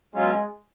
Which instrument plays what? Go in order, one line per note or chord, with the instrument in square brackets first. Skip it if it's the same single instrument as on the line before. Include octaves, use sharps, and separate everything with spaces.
[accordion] B2 F#3 C#4 F4 [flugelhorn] G#3